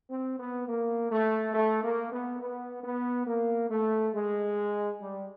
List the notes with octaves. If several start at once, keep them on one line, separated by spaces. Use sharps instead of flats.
C4
B3
A#3
A3
A3
A#3
B3
B3
B3
A#3
A3
G#3
G3